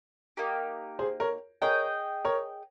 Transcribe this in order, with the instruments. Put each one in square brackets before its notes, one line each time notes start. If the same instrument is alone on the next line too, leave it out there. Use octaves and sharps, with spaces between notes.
[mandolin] A#3 D#4 G4
[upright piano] G#4 C5
A#4 C#5
[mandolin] G#4 D#5 G5 [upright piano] A#4 C#5
[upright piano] A#4 C#5